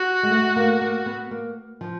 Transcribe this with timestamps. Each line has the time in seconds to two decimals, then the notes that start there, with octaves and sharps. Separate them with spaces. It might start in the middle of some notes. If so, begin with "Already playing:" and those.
Already playing: F#4
0.23 G#3
0.31 A3
0.56 A#3
0.81 A#3
1.06 B3
1.31 A#3
1.81 F3